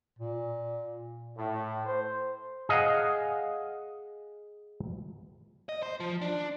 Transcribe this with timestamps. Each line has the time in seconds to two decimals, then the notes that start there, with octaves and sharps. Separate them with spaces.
0.19 A#2
1.37 A2
1.86 C5
2.69 G#4 D#5 F5 F#5
5.69 D#5
5.83 C5
6.00 F3
6.22 D4